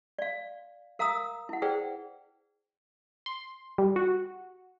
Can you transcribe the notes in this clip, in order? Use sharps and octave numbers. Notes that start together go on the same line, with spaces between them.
D5 F5
A#4 F5 A#5 D#6 E6
E4 F#5
G#4 B4 C5 D5 F#5 G5
C6
G3
F#4